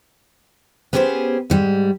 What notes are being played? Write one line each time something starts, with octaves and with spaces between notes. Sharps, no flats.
B3 C#4 G4 G#4 B4 C5
G#2 G3 G#3